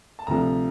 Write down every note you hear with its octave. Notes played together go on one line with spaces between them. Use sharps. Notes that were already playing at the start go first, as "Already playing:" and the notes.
A5
D2 C3 F3 A#5